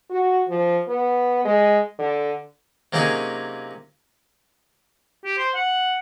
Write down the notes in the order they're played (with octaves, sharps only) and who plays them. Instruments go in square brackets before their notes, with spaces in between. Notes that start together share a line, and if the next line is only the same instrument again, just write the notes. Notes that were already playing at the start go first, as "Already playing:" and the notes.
[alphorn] F#4
F3
B3
G#3
D3
[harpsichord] C3 F#3 A#3 C#4 D#4 G#4
[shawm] G4
C5
F#5